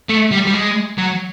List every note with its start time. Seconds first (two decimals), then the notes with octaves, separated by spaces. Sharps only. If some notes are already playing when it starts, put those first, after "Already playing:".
0.09 A3
0.32 G3
0.47 G3
0.54 G#3
0.98 F#3